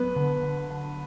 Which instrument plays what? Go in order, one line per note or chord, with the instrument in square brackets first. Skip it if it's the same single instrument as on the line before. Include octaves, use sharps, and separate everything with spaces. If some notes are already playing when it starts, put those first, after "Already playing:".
Already playing: [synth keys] F#3 B3 [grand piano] B4
[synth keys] D3
D3
D3